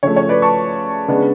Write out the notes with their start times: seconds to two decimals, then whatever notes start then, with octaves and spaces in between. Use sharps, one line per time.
0.03 C#3 F3 A3 C#5
0.16 C#5
0.29 B4 D5
0.42 A5 C#6
1.08 C#3 G#3 B3 D4